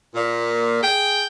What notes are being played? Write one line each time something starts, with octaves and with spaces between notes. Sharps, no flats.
A#2
G#4 G5